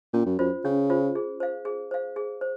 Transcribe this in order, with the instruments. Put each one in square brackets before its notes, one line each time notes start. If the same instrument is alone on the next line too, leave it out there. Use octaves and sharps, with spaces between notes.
[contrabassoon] A#2 [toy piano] C#4
[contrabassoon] F#2
[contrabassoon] F#2 [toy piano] F4 C5
[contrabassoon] C#3 [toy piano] C#4
[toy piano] F4 C5
G#4
C5 F5
G#4
C5 F5
G#4
C5